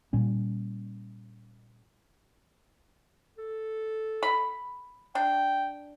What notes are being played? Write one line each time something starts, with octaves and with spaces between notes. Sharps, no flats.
A#2 G3 C#4
A4
B5
D4 G5